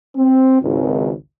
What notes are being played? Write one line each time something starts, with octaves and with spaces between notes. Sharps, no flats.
C4
G#1 C#2